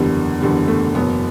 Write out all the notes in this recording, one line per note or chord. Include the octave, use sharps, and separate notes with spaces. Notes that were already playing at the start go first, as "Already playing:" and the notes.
Already playing: F#1 E2 D3 G3
F#1 E2 D3 G3
A3
F#1 E2 B2 F#3 B3